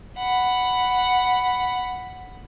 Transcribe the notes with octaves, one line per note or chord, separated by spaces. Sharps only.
F#5 B5